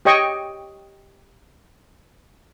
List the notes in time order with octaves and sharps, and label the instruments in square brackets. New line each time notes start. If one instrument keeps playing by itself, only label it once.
[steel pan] G4 C#5 D#5 G5 C#6